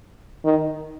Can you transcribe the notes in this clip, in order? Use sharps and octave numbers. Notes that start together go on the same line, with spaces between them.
D#3